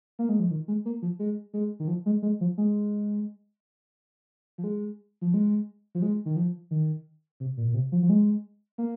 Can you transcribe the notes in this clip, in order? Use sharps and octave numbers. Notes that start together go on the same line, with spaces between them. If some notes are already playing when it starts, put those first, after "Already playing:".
A#3
G#3
F3
D#3
G#3
A#3
F3
G#3
G#3
D#3
F3
G#3
G#3
F3
G#3
F3
G#3
F3
G#3
F3
G#3
D#3
F3
D#3
C3
A#2
A#2
C3
F3
F3
G#3
A#3